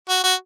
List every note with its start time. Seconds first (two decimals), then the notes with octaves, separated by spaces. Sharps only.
0.09 F#4
0.24 F#4